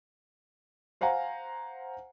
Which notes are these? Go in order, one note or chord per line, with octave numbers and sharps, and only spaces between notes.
C5 F5 F#5 G#5 A#5